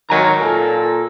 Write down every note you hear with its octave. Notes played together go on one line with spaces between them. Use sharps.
D#3 F#3 A#4 G#5 A#5
A#2 A4